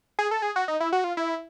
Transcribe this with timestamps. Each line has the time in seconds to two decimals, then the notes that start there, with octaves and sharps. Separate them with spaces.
0.19 G#4
0.31 A4
0.42 G#4
0.56 F#4
0.68 D#4
0.80 E4
0.92 F#4
1.04 F4
1.17 E4